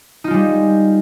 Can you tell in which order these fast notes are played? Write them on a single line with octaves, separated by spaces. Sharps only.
D#4 F4 G#3 G3